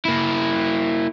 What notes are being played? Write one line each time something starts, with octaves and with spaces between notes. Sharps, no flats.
A#3 E4